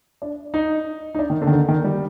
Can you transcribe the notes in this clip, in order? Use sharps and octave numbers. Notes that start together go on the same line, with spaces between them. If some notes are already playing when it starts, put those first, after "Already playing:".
D4
D#4
D#4
D4
D#3
D3
D#3
D3
D#3
G3